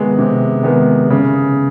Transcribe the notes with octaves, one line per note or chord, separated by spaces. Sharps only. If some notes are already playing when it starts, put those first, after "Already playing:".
Already playing: C3 D#3 G#3 B3
C3
D#3 G#3 B3
C#3